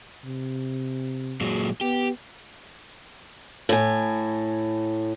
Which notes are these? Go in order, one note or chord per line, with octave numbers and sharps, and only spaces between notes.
C3
A#2 F#3 G#3
B3 G4
A2 G#5